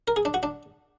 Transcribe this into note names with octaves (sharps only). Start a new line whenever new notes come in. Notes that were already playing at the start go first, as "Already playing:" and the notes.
A#4
G#4
D4
F#4
D4